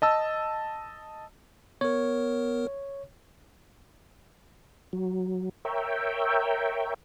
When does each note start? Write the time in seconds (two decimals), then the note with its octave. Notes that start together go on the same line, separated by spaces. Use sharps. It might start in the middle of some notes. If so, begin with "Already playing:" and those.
0.02 D#5 A5 E6
1.81 B3 A#4 C#5
4.93 F#3
5.65 A#4 C#5 E5 G5